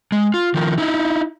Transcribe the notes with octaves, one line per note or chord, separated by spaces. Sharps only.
G#3
F4
D#3 F3 A#4
D#4 E4